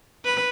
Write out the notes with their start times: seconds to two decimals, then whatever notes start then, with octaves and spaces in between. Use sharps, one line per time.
0.25 B4